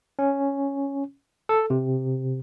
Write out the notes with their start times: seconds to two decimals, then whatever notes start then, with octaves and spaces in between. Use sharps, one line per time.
0.19 C#4
1.49 A4
1.70 C3